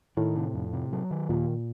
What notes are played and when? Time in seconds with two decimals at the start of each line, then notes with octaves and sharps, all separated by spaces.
0.17 A2 D#3
0.36 C3
0.54 F2
0.73 C3
0.92 F#3
1.11 D#3
1.29 D#2 A#2